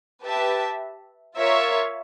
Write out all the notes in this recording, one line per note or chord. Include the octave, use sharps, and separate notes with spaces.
G4 B4 E5 A5
F4 A#4 C#5 E5